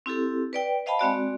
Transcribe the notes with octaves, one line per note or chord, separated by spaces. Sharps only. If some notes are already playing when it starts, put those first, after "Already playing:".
C4 E4 G4 A4
B4 D5 G5
C5 D#5 F5 G5 A5 B5
G#3 C4 F#4 D5